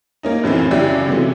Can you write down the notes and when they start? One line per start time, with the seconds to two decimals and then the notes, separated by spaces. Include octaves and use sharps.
0.23 A#3 C#4 D#4
0.43 F#2 A2 E3 C4
0.71 F#2 C#3 E4 G4 D5
1.08 C3 E3 F#3 G#3 A3